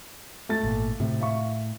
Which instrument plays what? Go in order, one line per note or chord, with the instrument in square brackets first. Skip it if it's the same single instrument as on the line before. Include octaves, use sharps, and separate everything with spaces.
[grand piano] A3 A6
[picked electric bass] G#1 A#2
[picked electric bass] A2 [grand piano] C3
[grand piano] E5 F5 C#6